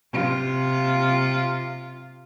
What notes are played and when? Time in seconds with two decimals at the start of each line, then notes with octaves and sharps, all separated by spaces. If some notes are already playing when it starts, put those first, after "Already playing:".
0.12 C3 F4